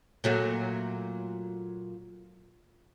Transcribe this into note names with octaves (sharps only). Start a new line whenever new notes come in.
A#2 F#3 A3